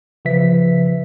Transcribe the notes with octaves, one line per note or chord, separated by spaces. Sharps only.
C#3 F3 B4 E5 B6